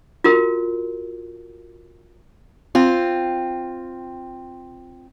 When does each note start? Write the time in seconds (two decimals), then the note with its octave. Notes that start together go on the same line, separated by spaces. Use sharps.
0.24 F4 F#4 A#4
2.75 C4 F4